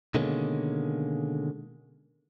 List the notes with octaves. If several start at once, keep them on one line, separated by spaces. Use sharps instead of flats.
B2 D3 D#3 G#3 A#3 C#4